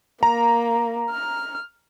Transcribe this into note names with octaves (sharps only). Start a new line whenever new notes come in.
A#3 A#5
F6